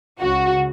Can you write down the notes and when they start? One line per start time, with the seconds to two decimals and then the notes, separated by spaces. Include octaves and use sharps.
0.21 C#2 C#3 F#4